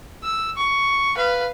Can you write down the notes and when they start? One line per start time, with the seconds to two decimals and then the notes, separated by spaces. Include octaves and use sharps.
0.23 E6
0.57 C#6
1.16 B4 F5